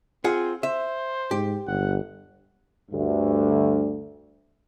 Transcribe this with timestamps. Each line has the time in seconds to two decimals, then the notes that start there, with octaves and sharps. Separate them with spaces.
0.24 C4 F4 G#4 F#5
0.63 C5 E5
1.31 G#2 G4
1.67 G1 F#5
2.91 D2 G2